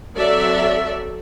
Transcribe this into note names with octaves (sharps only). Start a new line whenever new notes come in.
F#3 C4 A4 D5 E5